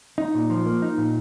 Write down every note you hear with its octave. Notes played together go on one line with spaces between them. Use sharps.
D#4
A#2
F3
A#3
D#4
A#2